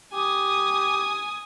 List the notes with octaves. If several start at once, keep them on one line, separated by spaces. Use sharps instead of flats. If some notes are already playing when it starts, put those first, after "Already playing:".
G4 G#5 D#6